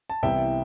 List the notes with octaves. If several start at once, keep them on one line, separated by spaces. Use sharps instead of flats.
A5
C2 C3 E3 B3 E4 E5 G5